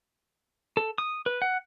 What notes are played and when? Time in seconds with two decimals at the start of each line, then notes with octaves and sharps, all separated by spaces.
0.77 A4
0.98 D#6
1.26 B4
1.42 F#5